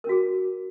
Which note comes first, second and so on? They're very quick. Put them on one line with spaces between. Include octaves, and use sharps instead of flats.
A#4 C#4 F#4 G#4